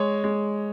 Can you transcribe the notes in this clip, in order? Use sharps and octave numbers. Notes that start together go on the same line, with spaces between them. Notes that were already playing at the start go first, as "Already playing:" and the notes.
Already playing: G#3 C#5
G#3